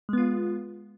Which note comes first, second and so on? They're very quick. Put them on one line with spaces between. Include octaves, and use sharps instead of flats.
G#3 B3 F4